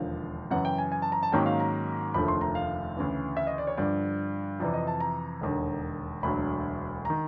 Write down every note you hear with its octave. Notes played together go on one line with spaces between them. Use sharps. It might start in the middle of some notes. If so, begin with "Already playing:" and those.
Already playing: E1 D#2 D3 F3 F5
F#2 C#3 E3 F#5
G5
G#5
G#5
A5
A#5
A5
G#2 D#3 F#3 A#3 C#4 G5
F5
A#5
F1 D#2 D3 F3 A3 B5
C6
A#5
F5
D2 C#3 E3
E5
D#5
D5
C#5
G2 D3 F3 D5
F2 C3 E3 D5
D#5
A5
A#5
E1 D#2 D3
E1 D2 D3 F#3 B5
D#3 A#5